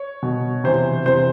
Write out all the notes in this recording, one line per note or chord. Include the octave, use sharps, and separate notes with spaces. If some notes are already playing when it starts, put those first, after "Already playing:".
Already playing: C#5
B2
C3 E3 C5
C3 E3 C5